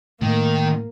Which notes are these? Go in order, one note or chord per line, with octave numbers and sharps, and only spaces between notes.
A2 D#3 A#3